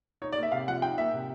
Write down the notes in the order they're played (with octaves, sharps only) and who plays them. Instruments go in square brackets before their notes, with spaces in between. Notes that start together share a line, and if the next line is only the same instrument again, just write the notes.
[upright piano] D#4 [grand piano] C#5
[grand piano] D5
[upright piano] A#3
[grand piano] E5
[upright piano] C3 [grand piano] F5
[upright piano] F3 [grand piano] F#5
[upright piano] D#4 [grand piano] G5
[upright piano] A#3 [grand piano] E5
[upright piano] C3